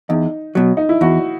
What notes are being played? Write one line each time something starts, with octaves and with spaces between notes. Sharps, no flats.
E2 D#4
B2 F#3
D#4
E4
E2 F#4